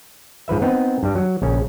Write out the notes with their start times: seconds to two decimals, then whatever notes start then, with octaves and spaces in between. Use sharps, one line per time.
0.48 G#2 F3 B4 E5
0.62 B3 C4 D#4 B4
1.03 G2 G3
1.15 F#3
1.42 A#1 C#3 C#4